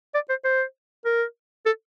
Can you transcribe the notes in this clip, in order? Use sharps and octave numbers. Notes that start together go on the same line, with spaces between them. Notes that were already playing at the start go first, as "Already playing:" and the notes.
D5
C5
C5
A#4
A4